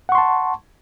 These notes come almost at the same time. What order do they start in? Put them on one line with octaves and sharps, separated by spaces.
F#5 C#6 C6 A5